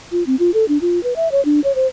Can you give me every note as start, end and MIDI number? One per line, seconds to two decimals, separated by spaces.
0.12 0.23 65
0.27 0.35 60
0.39 0.51 65
0.54 0.65 69
0.68 0.78 62
0.81 1.02 65
1.04 1.14 71
1.16 1.28 76
1.32 1.43 73
1.45 1.60 62
1.64 1.72 73
1.75 1.87 72